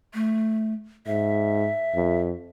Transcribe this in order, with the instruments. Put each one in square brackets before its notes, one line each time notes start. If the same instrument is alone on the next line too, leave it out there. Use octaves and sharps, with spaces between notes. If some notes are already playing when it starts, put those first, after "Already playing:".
[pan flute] A3
[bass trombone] G#2 [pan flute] E5
[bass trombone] F2